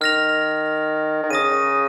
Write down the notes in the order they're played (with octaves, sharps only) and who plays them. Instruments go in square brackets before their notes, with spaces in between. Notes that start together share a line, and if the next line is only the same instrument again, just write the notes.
[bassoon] D#3 [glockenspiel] F6 A#6 F7
[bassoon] D#3
[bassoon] C#3 [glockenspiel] D#6 A#6 D#7